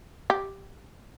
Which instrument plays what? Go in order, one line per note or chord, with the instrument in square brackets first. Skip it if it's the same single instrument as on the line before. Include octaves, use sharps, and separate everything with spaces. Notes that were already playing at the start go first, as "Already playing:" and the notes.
[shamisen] G4